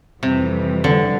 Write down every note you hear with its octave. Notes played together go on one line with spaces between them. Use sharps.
F2 C3 E3 G3
D3